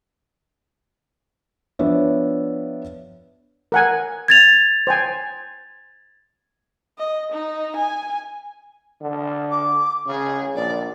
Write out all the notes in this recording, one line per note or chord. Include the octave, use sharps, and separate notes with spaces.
F3 B3 D4 C#5 E5
A#4 F#5 G#5
G#6 A6 F7
C5 G5 G#5
D#5
D#4
G#5
D3
D6
C#3 G#4
A#1 D5